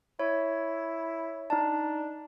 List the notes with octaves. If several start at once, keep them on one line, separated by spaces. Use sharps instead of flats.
E4 C#5
D4 D#4 A5